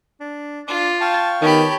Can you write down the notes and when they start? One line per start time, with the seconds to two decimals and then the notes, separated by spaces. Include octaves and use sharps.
0.20 D4
0.68 D4 F4 D6
1.01 F5 G5 A5 C#6
1.42 D#3 B3 G4 C#5 A5 B5